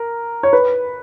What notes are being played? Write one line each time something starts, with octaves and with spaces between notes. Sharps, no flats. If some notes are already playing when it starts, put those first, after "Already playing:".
Already playing: A#4
C#5
B4